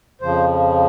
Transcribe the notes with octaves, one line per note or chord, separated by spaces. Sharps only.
F2 C#3 F3 C5